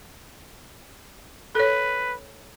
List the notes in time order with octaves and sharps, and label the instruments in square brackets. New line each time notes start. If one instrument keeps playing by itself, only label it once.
[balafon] A4 C#5 [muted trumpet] B4